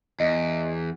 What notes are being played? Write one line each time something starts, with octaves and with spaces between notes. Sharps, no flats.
E2 D#5